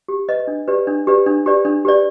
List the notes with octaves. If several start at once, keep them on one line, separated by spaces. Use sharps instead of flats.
G4
B4 D#5
D4
G4 B4 D5
D4
G4 B4 D5
D4
G4 B4 D5
D4
G4 B4 D5